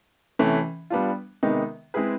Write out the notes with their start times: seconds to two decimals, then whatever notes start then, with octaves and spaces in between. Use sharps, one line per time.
0.39 C3 E3 A3 C#4
0.90 G3 B3 D4 F4
1.43 C3 D#3 G#3 B3 D#4
1.94 G#3 C4 E4 G#4 B4